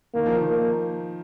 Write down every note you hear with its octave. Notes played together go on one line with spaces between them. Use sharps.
D#3 A#3
F3
D#3
A#3